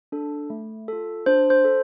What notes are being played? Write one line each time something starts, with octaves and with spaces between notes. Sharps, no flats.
D4 A4
A3
F4 A4
D4 C5
C5
A4